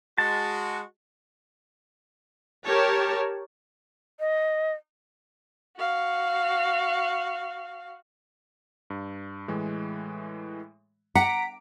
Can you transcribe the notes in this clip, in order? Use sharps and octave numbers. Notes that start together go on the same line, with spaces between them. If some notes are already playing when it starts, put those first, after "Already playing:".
G#3 F#4 A5
G4 A#4 C#5 A5
D#5
F#4 F5
G2
A2 E3 G#3
F#5 A#5 D6 B6 D7